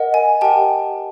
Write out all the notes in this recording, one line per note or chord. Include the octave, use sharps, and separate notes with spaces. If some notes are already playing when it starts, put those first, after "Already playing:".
Already playing: A#4 D#5 F#5
G#5
G4 A#4 D#5 F#5 G5 A5